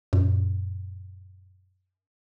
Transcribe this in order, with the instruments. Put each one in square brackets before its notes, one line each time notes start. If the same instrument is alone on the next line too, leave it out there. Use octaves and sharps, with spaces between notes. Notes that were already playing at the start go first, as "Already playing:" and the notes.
[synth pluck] F#2 A#2